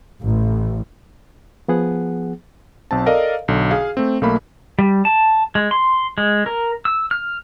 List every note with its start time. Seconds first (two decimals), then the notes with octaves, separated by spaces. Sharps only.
0.22 A1
1.68 F3 B3 G#4 F#5
2.91 B1 C4 A5
3.06 A4 A#4 D5 D#5 F5
3.48 B1 D3
3.71 G#4 F5
3.97 A3 C4
4.21 B1 A3 A#3 B5
4.79 G3
5.05 A5
5.55 G#3
5.71 C6
6.18 G#3
6.46 A#4
6.85 E6
7.11 F6